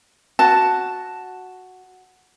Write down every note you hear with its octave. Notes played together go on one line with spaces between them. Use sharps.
F#4 A5